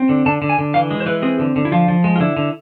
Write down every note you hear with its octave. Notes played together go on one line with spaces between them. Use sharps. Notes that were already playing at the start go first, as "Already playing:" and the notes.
Already playing: C4
D3
D3 A5
D3
G#5
D3
E3 F5
G#3
C5
E3 B4
C4 G#4
D3
D3
E4
F3 F4
F3
G#3
F4
D3 E4
D3